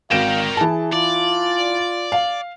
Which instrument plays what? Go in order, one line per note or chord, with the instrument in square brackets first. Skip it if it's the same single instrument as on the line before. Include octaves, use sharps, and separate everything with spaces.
[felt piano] G#1 D7 E7 [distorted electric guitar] A#4 G5 [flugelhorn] F5
[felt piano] E3 A5 [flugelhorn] G#4
[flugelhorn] F4 [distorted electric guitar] D5
[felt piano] F5